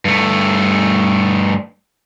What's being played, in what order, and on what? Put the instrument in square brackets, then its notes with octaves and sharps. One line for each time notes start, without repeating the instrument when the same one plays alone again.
[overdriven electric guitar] G2 A3